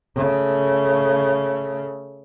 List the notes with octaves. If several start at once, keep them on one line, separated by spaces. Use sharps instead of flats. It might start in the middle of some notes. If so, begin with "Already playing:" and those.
C#3 A3